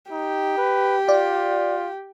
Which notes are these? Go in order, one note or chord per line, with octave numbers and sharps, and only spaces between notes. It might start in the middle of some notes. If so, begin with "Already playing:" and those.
D#4 G4
B4
F4 D5